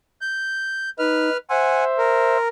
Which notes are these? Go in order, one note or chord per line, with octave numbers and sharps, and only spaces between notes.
G6
D#4 B4 F6
C5 E5 F#5 G#5
A#4